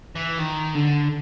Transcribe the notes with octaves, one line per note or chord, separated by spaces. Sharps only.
E3
D#3
D3